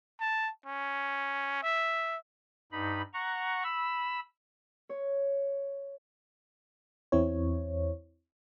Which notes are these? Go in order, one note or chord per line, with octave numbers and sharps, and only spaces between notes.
A5
C#4
E5
G2 D#4 B5
F#5 A#5 C#6
B5 E6
C#5
E2 C4 E4 C#5